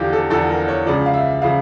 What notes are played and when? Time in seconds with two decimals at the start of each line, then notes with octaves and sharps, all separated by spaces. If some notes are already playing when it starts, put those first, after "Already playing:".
Already playing: E2 D3 F3 F4 G4
0.13 A4
0.30 E2 D3 F3 A4
0.49 A#4
0.68 C#5
0.86 C#2 C#3 F3 D5
1.06 F5
1.14 E5
1.42 C#3 F3 F5